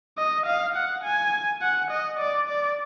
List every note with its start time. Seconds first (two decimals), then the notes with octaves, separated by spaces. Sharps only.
0.18 D#5
0.46 F5
0.76 F#5
1.04 G#5
1.62 F#5
1.91 D#5
2.19 D5
2.48 D5